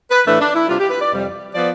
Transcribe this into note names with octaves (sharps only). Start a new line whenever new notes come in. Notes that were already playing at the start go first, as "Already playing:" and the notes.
B4
A2 E3 A3 D4 B4
D4
E4
C3 G3 D4 F4
G4
B4
D5
F2 C3 G3
F3 B3 D5